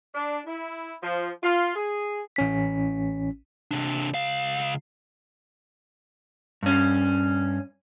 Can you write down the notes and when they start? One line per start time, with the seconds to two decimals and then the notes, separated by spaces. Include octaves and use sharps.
0.15 D4
0.45 E4
1.02 F3
1.43 F4
1.75 G#4
2.36 A1 C#4 B6
3.71 C3 D4
4.14 C#2 F5
6.63 G2 C#4